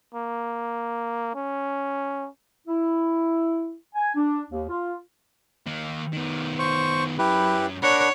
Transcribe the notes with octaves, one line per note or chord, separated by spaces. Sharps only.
A#3
C#4
E4
G#5
D4
D#2
F4
D#3 A#3
D#3 B3
C5 C#6
F#2 E4 G4 B4
D4 A#4 C#5 F#5 B5